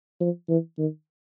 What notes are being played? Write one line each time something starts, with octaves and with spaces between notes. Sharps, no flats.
F3
E3
D#3